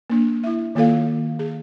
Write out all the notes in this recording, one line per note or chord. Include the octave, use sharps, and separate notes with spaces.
A#3 D4
E4 E5
D#3 A#3 F4 A4 F5
G#4